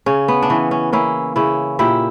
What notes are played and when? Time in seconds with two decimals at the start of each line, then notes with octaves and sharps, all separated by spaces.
0.06 C#3 C#4
0.28 B3
0.42 D4
0.50 E3 C#4
0.71 C#4
0.92 A#3 C#4 E4
1.36 C#3 C#4 E4
1.79 A#2 E4 G4